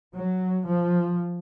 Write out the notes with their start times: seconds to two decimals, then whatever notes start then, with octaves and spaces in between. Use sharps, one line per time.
0.14 F#3
0.67 F3